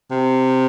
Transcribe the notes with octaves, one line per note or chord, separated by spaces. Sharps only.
C3